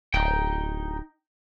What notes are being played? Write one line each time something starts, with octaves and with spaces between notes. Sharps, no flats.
D1 D#4 G5